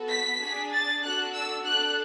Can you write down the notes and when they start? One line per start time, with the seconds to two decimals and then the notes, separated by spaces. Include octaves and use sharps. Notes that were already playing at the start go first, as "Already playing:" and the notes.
Already playing: B3 F#4 A4
0.10 B6
0.41 D4 G#4
0.72 A6
1.03 D4 F#4 A4 F#6
1.34 E6
1.65 D4 A4 F#6